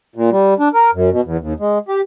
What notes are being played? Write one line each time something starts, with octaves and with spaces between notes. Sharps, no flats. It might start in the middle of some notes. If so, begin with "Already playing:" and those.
A#2
G3
D4
A#4
F#2
B2
E2
D#2
G#3
G4